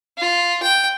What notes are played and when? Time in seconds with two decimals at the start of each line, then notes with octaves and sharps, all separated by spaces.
0.18 F4
0.63 G5